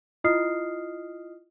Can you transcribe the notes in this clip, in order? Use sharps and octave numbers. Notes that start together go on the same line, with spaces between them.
E4 F4 D#5 D#6 F6 C7